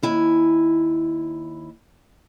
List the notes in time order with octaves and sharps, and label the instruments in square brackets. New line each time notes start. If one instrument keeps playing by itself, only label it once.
[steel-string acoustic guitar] D#2 E4 G#5